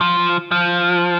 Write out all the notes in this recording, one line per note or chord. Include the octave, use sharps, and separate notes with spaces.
F3
F3